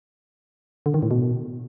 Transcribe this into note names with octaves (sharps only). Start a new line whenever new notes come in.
D3
D#3
A2
B2